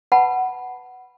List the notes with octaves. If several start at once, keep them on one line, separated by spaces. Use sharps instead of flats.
B4 F#5 A5 B5